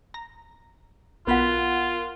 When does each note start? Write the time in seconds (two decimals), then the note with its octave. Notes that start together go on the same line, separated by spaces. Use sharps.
0.14 A#5
1.27 B1 B3 F4 A#4 F#5 B6